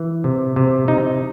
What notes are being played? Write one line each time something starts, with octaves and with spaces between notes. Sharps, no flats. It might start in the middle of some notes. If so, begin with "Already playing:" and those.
Already playing: E3
C3
C3
C3 D#4